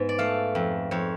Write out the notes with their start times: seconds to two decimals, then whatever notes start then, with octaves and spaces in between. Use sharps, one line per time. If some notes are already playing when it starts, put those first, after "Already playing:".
Already playing: G#2 B3
0.09 D5
0.19 A3 F5
0.55 F2
0.91 F2 C#5